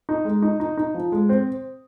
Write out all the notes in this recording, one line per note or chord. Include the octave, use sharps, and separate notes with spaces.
D#4
G#3
D#4
D#4
D#4
F3
G#3
C4